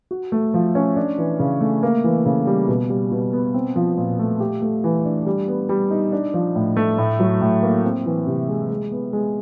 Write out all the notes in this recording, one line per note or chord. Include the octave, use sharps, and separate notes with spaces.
F#4
A3
F3
C#4
D4
E3
C#3
A3
A#3
E3
C#3
G3
B2
G3
B2
B3
C4
F3
A#2
A3
G4
A3
E3
D4
G3
B3
G3
D#4
D4
F3
A2
A3
A2
F#3
A2
A#3
C4
E3
C3
G#3
G#3
B3
G#3